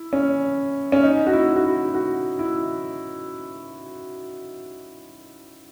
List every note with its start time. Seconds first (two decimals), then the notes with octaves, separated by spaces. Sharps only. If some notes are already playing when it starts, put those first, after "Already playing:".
Already playing: E4
0.13 C#4
0.92 C#4
1.03 D#4
1.27 F#4
1.33 E4
1.56 F#4
1.64 E4
1.94 F#4
2.39 E4